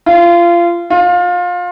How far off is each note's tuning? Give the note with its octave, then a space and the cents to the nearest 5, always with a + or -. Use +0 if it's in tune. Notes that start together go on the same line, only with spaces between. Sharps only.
F4 -25
F4 +25